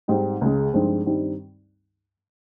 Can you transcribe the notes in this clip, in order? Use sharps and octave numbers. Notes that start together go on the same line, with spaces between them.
G#2 G3 C4 D#4
C#2 C#3 G#3
G2 F3 G#3 C4 D#4
G2 D#3 G3 C4 D#4